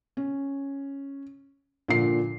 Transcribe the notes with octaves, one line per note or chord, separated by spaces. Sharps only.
C#4
A#2 D3 F3 C7